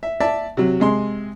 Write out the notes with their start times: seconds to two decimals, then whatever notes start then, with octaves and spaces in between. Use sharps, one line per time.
0.03 E5
0.20 D5 E5 A5
0.57 C3 F#3
0.80 C3 G#3 C6